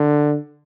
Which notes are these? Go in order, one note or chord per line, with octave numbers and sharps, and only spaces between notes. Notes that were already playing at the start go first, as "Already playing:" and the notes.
Already playing: D3